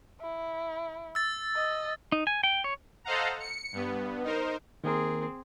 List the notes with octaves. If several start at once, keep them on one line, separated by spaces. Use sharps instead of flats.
E4
E6 A6
D#5
D#4
G#5
G5
C#5
A4 C5 D#5 F5 F#5 A#5
C#7
G2 B3
D#4 A#4 C5
D#3 A#3 C4 G#4 A#4